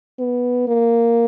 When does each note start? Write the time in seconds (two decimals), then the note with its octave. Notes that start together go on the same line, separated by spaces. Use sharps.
0.19 B3
0.68 A#3